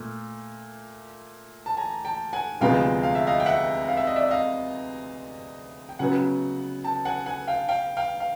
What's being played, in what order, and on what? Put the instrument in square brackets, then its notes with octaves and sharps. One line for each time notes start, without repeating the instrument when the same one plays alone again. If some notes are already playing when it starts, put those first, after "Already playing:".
Already playing: [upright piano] A#2 A3
[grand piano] A5
G#5 A#5
G5 A5
F#5 G#5
[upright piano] D2 C3 F3 G#3 B3 [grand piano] F5 G5
[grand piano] F5
E5
D#5 F5
G5
E5 F#5
F5
E5
D#5
D5 E5
D#5 F5
G5
[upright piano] C#3 F#3 B3 [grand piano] F#5 G#5
[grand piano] G5 A5
F#5 G#5
F#5 G#5
F5 G5
F5 G5
F5 G5
F5